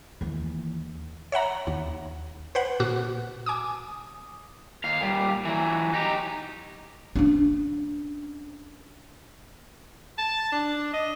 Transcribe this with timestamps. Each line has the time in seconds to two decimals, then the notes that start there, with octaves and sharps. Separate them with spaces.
0.21 D#2 E3
1.32 C#5 E5 F#5 A#5
1.67 D#2
2.55 B4 C5 F#5
2.80 A#2 F#4
3.46 G#5 D6 D#6
4.84 D#2 F5
5.01 A#2 G3
5.45 E3 F#3
5.93 D#4 G4
7.16 C#4 D4
10.18 A5
10.52 D4
10.93 D#5